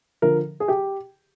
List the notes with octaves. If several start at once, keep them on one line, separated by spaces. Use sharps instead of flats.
D3 F3 A#4
G#4
G4